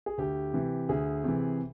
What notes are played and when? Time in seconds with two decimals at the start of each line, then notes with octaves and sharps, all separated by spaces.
0.06 G#4
0.18 D2 G4
0.53 C3 E3
0.89 D2 G#4
1.24 C3 E3